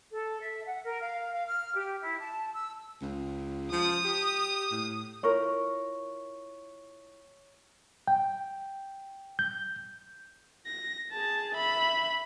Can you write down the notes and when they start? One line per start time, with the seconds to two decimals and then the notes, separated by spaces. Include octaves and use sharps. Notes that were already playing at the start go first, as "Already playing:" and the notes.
0.11 A4
0.40 E5
0.67 F#5
0.85 A#4
1.02 F5
1.32 F5
1.47 F6
1.75 G4
2.02 E4
2.20 A5
2.53 E6
3.02 C#2
3.72 F3 D#6
4.05 G4
4.71 A2
5.23 E4 F4 A#4 C#5 C#6
8.08 G5
9.39 G6
10.66 A#6
11.12 G#4 A5
11.55 E5 B5